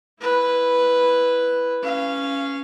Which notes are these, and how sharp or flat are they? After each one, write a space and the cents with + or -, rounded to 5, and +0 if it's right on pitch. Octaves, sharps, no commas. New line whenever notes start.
E4 +0 B4 +0
C#4 +0 F5 -20